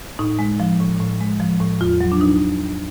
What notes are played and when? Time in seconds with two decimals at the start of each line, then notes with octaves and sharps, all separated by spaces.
0.19 A2 D#4
0.39 G#3
0.60 F3
0.80 A2
1.00 A2
1.21 G#3
1.40 F3
1.60 A2
1.80 E2 F4
2.01 F#3
2.12 D4
2.21 B2 D#4